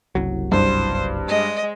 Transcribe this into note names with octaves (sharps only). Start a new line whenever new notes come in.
F#1 C2 F#3
G2 C5
G#3 D#5